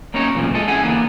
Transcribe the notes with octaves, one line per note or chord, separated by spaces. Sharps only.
A#3 C#4 D#4 A#4 C#5
B1 E2 A#2 C#3 F3
G#3 A4 D#5
C#4 E4 G#4 F#5 G#5
D3 E3 A#3 B3